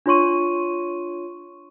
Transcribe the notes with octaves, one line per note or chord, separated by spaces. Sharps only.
D4 F4 C#5 C6 C#6 D#7